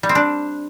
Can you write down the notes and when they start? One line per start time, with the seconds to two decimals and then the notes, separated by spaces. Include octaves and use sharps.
0.03 G3
0.09 C4
0.15 D4